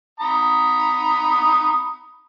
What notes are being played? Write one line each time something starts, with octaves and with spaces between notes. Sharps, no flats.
A#5 B5 D#6